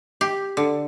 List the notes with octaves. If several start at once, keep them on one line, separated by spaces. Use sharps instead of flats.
G4
D3